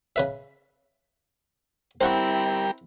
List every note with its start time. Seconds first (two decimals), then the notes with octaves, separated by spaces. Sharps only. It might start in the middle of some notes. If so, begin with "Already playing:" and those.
0.16 C#3 B4 E5
2.01 G3 C4 E4 G4 A#4 C5 F#5 C#6